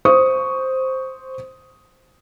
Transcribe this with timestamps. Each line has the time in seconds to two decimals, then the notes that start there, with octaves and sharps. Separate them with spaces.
0.05 C5 C#6 D#6